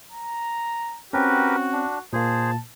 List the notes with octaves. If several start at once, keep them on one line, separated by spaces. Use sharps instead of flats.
A#5
C4 C#4 F#4 G4 A#4 B4
D4
A#2 A#3 G#4 C5 A5